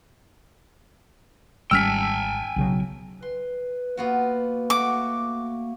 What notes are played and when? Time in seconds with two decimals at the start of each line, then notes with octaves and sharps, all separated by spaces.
1.71 G#1 G3 C#4 G5 G#5 E6 F6 B6
2.56 B1 C#3 F#3
3.22 B4 C6
3.97 A#3 B3 F4 F#4
4.70 A3 F#4 D6